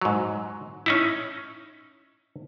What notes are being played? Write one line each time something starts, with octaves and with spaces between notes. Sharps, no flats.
G#2 F#3
C#4 D#4 E4